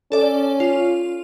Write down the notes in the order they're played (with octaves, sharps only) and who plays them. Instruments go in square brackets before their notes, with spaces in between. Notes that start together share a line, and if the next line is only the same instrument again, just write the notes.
[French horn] C#4 [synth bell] A4 D5
[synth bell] F4